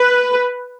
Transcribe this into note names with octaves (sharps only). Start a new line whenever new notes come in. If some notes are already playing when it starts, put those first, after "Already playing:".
Already playing: B4